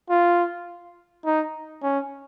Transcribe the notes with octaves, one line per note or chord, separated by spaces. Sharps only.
F4
D#4
C#4